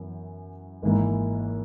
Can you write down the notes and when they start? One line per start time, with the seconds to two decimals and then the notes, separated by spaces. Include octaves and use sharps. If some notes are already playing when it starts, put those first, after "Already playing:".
Already playing: F#2 E3 B3
0.82 G#1 G#2 E3 A#3